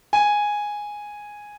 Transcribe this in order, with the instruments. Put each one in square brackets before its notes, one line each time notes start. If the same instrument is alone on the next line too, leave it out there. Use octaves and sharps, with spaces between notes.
[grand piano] G#5